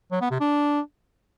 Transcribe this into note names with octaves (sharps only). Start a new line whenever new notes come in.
F#3
B3
C3
D4